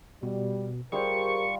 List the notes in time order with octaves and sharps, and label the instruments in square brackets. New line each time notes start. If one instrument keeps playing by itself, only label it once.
[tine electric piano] B2 [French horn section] G3
[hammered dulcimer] G3 F4 F5 [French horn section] G4 A#4 [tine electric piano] G#4 C5 [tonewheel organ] C#6